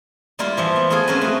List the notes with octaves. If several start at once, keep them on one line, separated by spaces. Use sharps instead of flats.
G3 A#3 E4 F4
E3 F3 E5
B3
A3 A#3 F4 G#4 A4
C4 C#4 A#4 B4
A3 F#4